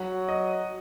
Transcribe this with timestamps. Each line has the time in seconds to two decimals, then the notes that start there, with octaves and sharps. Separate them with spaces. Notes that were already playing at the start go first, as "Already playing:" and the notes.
Already playing: F#3 F#5
0.29 D#5